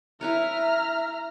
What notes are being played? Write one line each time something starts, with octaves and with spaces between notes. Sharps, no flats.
E4 B4 C#5 E5 A#5 F6